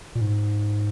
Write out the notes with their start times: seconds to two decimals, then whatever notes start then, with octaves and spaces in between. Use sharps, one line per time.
0.15 A#2
0.21 G#2